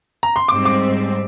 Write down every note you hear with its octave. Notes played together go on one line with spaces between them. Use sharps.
A#5
C6
G#2 G3 C4 D6
D6